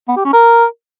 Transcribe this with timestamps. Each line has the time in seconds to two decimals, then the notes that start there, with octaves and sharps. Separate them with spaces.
0.08 B3
0.17 G4
0.25 C#4
0.33 A#4